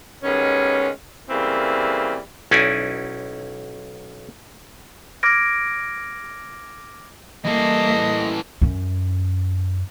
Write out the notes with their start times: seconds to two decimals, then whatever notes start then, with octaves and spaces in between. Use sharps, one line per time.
0.23 D#3 G3 G#3 B3 C#4
1.30 C#3 E3 G3 A3 A#3 C4
2.51 B1 C#4 D#4 E4 D5 G#5
5.23 D6 F6 G#6 A#6 D7
7.45 E3 G3 A#3 A4 D#5
8.62 F#2 C#4